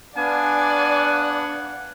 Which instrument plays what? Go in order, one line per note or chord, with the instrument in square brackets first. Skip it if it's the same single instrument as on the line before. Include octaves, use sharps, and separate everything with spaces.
[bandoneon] B3 D4 [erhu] D5 [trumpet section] F5 G#5 [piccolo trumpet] F#5